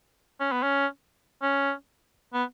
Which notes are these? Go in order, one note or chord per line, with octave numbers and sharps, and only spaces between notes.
C#4
B3
C#4
C#4
B3